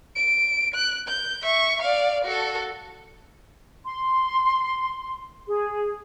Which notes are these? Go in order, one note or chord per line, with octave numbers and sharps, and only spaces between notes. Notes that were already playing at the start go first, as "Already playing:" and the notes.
D7
F#6
G6
E5 C#6
D5 F5
F#4 A4
C6
G#4